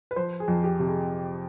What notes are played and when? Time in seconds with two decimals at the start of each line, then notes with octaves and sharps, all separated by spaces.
0.11 B4
0.16 F3 C5
0.40 G#4
0.48 F2
0.64 G4
0.79 C3
0.87 G#4